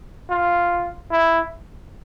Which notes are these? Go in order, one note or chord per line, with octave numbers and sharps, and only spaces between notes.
F4
E4